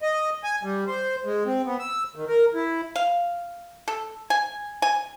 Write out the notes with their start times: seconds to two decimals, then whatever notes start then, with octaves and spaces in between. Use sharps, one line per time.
0.02 D#5
0.44 G#5
0.63 G3
0.87 C5
1.25 G#3
1.46 C4
1.66 B3
1.79 E6
2.16 D#3
2.28 A#4
2.54 E4
2.96 F5
3.88 A4
4.30 G#5
4.82 G#5